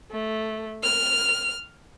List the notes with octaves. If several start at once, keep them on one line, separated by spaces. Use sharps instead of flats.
A3
F6